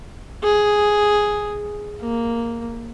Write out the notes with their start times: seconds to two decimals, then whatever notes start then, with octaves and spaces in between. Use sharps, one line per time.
0.43 G#4
2.01 A#3